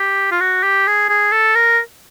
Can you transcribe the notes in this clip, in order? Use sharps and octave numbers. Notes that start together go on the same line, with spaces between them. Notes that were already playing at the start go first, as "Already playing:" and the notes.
Already playing: G4
F4
F#4
G4
G#4
G#4
A4
A#4